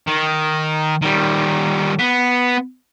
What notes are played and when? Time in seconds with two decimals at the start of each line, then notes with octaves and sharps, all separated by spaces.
0.07 D#3
1.02 D#3 G3
1.99 B3